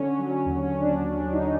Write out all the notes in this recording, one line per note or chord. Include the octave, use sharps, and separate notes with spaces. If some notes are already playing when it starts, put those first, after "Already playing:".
Already playing: D3 C#4
C#4
F#3
C#4
D#2
C#4
F#3
D4
D#2 D4
D4
F#3
D#4